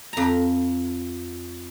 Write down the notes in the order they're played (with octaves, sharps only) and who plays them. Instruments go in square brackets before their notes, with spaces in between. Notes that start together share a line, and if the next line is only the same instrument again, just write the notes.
[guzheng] F2 A#5